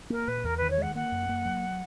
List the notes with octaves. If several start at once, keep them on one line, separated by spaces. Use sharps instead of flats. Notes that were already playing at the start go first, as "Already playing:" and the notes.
A#3 A#4
A#2 B4
E2 A#4
D#3 B4
C#5
G#3 F#5
A#3 F#5
F#2
A#3
F#3